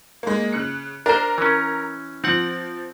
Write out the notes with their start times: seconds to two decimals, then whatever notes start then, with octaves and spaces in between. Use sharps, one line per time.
0.23 G#3 A#3
0.53 C#3 F#6 C#7
1.06 D4 A#4 C5
1.38 E3 C#4
2.24 F3 C4 F#5